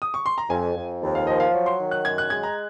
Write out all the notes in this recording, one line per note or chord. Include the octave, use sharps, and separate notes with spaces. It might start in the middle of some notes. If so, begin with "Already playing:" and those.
D#6
C#6
C6
A#5
F2 G#5
F2
D#2
F5
F3 D#5
F5
F#3
C6
D#3
F#6
F#2 G#6
F#6
G#3 G#6
A#5